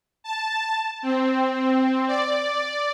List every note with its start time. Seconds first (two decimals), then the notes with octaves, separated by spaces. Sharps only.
0.24 A5
1.03 C4
2.08 D5